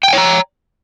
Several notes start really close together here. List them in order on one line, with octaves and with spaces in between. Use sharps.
G5 G#5 C#5 A#5